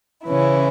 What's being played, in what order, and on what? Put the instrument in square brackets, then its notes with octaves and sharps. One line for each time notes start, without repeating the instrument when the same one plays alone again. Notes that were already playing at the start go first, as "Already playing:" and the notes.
[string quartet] C#3 E3 C#4 E4